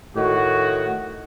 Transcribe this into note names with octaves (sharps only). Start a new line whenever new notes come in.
A2 D#3 F#4